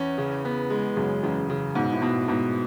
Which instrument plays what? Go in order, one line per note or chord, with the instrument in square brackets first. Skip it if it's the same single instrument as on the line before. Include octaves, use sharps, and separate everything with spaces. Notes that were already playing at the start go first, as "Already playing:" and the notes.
Already playing: [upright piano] E2 [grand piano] C#4
[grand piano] C#3
B3
G#3
[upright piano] F#2 [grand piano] C#3
[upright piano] E2 [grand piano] C#3
[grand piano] C#3
[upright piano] G#2 [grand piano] B2
[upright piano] A2
[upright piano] G#2 [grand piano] B2
[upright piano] G#2 [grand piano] B2